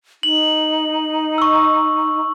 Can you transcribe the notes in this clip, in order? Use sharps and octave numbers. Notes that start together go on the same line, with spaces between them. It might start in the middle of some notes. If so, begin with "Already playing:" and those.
D#4 F#7
C#6 E6